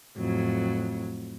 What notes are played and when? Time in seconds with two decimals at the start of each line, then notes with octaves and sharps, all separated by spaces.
0.16 F2 A2 F#3